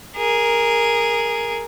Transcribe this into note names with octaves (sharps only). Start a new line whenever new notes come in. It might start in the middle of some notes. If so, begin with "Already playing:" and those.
G#4 A#4